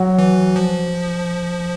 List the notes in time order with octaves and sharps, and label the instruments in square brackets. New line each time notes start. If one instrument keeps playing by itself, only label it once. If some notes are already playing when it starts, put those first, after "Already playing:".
Already playing: [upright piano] F#3 F#4
[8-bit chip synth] E3
F3